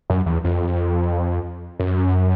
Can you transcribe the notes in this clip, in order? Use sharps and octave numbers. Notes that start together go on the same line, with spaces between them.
F#2
E2
F2
F#2